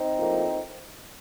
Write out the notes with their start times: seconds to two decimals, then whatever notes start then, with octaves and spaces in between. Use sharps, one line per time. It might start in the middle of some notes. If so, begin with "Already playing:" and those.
Already playing: C4 D#4
0.18 A2 F3 A#3